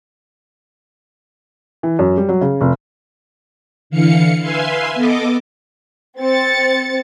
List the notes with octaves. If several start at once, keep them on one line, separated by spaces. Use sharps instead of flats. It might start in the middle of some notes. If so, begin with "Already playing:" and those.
E3
F#2
G3
F#3
C#3
F1
D3 E3 F5 C#7
B4 E5 F5 G#5 C6
B3 A4 D#5 D6
C4 A6 C#7